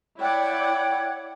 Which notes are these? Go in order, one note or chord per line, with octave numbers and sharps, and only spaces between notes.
E4 C#5 D5 F#5 G5